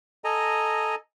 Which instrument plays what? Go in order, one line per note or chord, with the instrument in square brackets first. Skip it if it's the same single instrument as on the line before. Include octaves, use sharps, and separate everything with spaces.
[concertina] A4 D#5 G#5 A#5